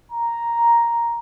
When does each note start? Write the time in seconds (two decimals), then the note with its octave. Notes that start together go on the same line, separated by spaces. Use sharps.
0.11 A#5